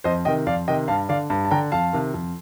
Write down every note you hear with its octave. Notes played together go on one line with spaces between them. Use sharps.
F2 C5 D#5
C3 D#3 D#5 G5
F2 D5 F5
C3 D#3 D#5 G5
G2 F5 A5
D3 D5 F5
G2
A5
D3 G5 A#5
F2 F5 A5
C3 D#3
F2